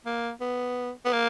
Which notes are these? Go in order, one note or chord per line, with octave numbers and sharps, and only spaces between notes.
A#3
B3
B3
A#3